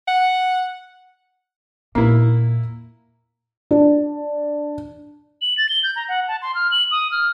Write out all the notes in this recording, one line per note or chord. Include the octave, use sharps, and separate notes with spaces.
F#5
A#2 A#3 E4
D4
F#7
A6
G7
G6
A#5
F#5
A5
C6
F6
F#7
D#6
F6